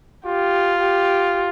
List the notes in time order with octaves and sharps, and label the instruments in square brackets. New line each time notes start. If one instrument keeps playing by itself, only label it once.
[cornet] F4 [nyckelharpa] G4
[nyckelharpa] G4